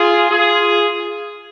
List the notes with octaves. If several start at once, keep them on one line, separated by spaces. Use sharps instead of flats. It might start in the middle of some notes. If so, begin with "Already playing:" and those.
Already playing: F4 G#4
F4 G#4